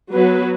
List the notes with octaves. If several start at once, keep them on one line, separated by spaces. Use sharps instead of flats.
F#3 B3 F#4 B4